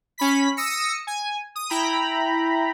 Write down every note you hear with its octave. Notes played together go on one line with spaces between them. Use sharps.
C#4 B5 B6
D#6 E6 A#6 C#7
G#5
D#6
E4 G5 A#5 B5